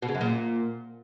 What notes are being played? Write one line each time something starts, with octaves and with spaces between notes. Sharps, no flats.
B2
C#3
F#2
A#2